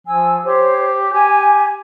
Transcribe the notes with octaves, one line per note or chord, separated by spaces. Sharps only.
F3 G#5 E6
G4 C5 C#5
G4 G#5